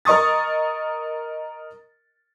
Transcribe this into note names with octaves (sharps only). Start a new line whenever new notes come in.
A#4 D#5 C#6 D#6 A6